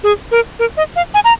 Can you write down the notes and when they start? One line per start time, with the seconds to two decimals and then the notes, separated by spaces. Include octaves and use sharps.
0.04 G#4
0.31 A#4
0.59 A#4
0.77 D#5
0.96 F5
1.14 G#5
1.25 A#5